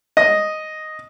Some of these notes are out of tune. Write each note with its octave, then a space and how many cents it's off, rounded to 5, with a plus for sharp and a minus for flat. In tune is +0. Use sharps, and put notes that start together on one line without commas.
D#5 +0 D#6 +0